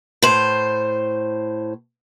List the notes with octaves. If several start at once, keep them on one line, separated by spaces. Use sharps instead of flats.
A2 C5